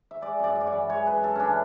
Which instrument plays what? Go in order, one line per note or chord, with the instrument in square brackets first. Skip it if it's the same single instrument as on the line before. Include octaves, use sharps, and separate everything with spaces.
[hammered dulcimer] E5
G#3 D5
F#2 D5
F#2
D5
C#5
E3
G#3 C#5
F#2 B4
F#2 A4
E3 C#4 D4